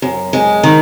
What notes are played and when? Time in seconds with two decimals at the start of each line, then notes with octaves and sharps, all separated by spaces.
0.02 F#2
0.33 G#3
0.63 D#3